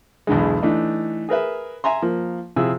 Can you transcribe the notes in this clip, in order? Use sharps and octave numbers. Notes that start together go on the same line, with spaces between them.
B1 E2 D3 G#3
E3 A3 D4 D#4
G#4 A#4 B4 E5
E5 G#5 A#5 C6
F3 A#3
C3 F3 E4 F4 G#4 E6